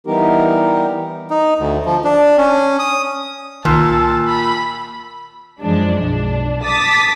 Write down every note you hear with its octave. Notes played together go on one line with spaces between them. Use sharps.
E3 G3 B3 D#4 G4 A#4
D#4
D2
F3
D4
C#4
D#6
C2 A#2 D#3 A5 E6
B5
F#2 E3 F3 G#3 D4
B1 D4
A5 D6 D#6 A6 B6